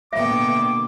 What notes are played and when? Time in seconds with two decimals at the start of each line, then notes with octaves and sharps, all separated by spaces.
0.13 B2 D3 A#3 B3 E5 G5 D6